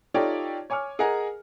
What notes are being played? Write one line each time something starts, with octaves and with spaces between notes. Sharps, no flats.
D#4 F4 G4 A4 C#5 D5
C#5 G#5 C#6 D6 F6
G#4 A#4 D#5 F#5 G#5 A#5